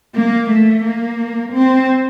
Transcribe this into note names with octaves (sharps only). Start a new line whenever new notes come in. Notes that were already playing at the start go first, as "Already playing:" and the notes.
A#3
A3
A#3
C4